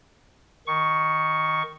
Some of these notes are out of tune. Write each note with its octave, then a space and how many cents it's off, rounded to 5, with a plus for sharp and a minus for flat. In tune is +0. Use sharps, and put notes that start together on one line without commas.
D#3 +0 C#6 +0